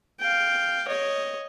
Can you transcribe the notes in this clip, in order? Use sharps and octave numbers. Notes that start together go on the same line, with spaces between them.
F5 G5
C#5 D#5